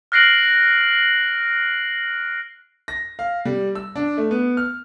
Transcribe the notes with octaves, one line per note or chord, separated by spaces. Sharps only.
F6 F#6 A#6 C7 D7 F#7
A#6
F5
G3
E6
D4
A3
B3
F6